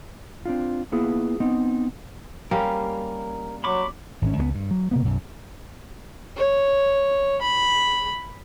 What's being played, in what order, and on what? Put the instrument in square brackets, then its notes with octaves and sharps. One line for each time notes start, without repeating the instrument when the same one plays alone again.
[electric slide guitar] C4 D4 F4
A#3 B3 E4 F4 G#4
B3 C4 D#4 D#5
[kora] G3 A#3 C#4 [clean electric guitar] A#4
[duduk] F#3 [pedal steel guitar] B5 C#6 D6
[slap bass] G#1 C#4
C#2 G3 B3
G2
F#3
C3 A#3 B3
B1 F#2
[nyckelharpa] C#5
B5